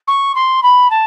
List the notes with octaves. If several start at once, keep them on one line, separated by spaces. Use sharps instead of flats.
C#6
C6
B5
A5